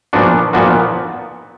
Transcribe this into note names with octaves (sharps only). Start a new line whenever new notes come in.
A#2 F3 B3 D4 F#4
A#2 F3 B3 D4 F#4